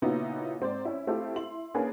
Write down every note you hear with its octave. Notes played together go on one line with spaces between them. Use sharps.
A#2 C#3 B3 D#4 E4 F#4
G#2 C4 C5 D5
C#4 E4
A3 C4 E4 F4 G4 A4
E4 C6 F#7
A#3 C#4 D4 G#4 A#4 B4